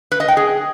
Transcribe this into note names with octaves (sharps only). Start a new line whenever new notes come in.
B4
D#5
G5
G#4